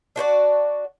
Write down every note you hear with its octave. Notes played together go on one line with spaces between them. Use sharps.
D4 F#4 C5 D5